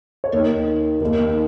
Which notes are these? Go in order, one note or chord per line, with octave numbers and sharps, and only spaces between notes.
C#5
D#2 D#3 A#4
D#2 D#3 A#4